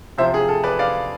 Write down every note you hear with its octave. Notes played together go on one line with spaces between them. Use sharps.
C3 F3 C5 E5
G#4
A4
B4 D5
D5 F5